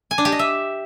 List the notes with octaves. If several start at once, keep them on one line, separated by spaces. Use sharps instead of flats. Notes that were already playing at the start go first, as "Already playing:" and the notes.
G#5
D4
G4
D#5
E5